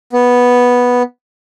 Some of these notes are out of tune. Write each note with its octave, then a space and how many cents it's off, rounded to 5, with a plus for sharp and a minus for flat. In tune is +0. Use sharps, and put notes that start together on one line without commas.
B3 -5